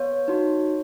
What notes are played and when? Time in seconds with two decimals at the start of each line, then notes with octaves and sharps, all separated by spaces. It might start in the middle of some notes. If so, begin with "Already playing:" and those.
Already playing: B3 C#5
0.28 D#4 F#4